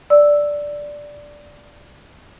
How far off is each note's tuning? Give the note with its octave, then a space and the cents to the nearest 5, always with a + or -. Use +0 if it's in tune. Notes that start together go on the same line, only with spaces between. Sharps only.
D5 +0 E6 +0